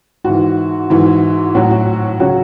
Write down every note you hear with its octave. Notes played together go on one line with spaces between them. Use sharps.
G#2 F#4
E3
G#2 E3 F#4
A2 F#3 F#4
F#4
C#3 F#3 F#4